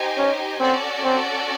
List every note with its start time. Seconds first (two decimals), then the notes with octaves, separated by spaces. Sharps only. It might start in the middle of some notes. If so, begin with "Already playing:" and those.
Already playing: D#4 G4 C5 D#5 G#5
0.18 C#4
0.60 C4 C#4 F#4 A4 D5
1.04 C4